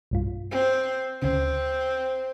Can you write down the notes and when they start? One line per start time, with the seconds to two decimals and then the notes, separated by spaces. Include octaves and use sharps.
0.11 B1 G2 F4
0.51 C4
1.22 D2 C#3 C4